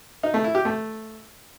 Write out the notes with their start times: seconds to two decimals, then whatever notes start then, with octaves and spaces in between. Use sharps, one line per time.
0.23 D#4
0.34 A3
0.44 E4
0.55 G4
0.65 A3